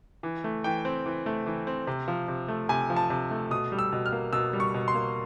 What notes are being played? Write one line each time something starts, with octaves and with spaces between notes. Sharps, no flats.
E3
A3
E3 G5
C4
E3
A3
E3
C4
C3
F3
C3
A3
C3 G#5
F3
A5
C3
A3
B2 D#6
G3
E6
B2
F6
A#3
B2 E6
G3
C#6
B2
C6
A#3